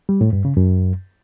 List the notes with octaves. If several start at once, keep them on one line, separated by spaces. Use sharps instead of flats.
G3
A2
G2
C#3
F#2